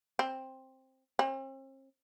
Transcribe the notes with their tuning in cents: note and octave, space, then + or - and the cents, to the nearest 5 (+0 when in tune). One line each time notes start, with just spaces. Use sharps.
C4 +10
C4 +45